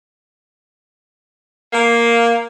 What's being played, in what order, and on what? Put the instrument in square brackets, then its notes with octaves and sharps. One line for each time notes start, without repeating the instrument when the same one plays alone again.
[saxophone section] A#3